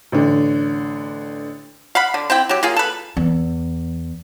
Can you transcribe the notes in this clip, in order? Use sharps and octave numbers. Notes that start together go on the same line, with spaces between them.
A1 D3
F5 F#5 B5
D3
C4 E4 G5
F#3 G4
A#3 F4 G#4
A4 B4
E2